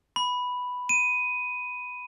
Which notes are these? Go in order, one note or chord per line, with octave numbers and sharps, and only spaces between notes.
B5
D#7